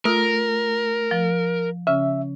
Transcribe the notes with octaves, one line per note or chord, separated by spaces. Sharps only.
A3 F4 A#4 D#6 E6
F3
C#3 C#4 E5